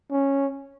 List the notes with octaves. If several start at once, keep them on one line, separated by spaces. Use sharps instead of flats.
C#4